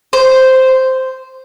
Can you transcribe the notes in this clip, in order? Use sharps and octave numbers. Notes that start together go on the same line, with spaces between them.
C5